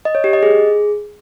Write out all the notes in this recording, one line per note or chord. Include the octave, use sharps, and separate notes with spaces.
D#5
C#5
G4
D#5
G#4